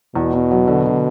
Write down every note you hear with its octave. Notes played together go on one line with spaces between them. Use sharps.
E2 B2
E2
F#3
D3
D3